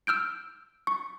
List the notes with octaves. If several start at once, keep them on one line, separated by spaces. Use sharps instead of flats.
E6 F6 G6 D7
C#6